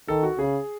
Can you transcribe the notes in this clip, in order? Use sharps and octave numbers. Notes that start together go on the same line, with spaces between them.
D#3 A4
F#4
C#3 G#4